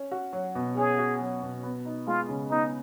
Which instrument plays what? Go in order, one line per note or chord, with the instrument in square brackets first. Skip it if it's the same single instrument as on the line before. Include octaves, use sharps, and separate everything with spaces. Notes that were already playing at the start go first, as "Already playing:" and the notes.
Already playing: [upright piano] C#4
F#4
F#3
B2
[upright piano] C#4 [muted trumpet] G#4
[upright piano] F#4
F#3
B2
B3
D#4
[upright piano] G#3 [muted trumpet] F4
[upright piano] C#3
[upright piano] B3 [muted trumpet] D#4